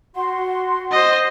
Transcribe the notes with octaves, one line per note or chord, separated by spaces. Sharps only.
F#4 F#5 C6
C5 D#5